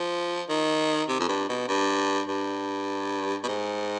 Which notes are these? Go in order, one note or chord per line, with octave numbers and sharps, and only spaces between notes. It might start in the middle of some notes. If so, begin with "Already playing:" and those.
Already playing: F3
D#3
C3
F2
G2
B2
G2
G2
B2
G#2